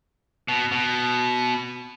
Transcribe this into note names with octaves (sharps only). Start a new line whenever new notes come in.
B2
B2